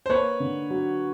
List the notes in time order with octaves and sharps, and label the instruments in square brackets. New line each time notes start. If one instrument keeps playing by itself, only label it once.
[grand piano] C5
[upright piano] A#3 [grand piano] B4 C#5
[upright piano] D3
F#3